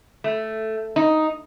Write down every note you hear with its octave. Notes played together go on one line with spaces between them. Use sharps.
A3
D#4